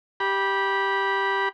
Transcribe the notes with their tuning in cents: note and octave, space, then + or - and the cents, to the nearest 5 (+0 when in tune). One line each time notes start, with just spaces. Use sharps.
G4 +0 B5 -20